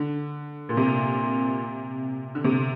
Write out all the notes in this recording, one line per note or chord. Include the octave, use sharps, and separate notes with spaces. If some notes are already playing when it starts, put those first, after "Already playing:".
Already playing: D3
A#2
C3
D3
C3